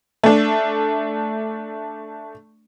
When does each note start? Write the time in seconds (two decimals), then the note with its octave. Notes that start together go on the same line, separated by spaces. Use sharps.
0.23 A3 D4